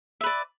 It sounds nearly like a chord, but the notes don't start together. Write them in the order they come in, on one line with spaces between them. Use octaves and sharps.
E5 B4 D5